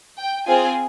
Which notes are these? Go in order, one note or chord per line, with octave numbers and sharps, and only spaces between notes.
G5
C4 F4 G#4 G#5